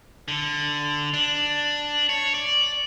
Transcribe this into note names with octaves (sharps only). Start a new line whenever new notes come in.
D3
D4
C#5
D5